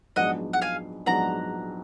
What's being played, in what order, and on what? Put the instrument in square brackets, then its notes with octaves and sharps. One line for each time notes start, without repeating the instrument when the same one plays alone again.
[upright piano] A#1 G#2 F#3 B3 D4 [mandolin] D#5 F#5
[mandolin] F#5
F5 G#5
[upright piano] A#1 G#2 F#3 B3 D4 [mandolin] F#5 A#5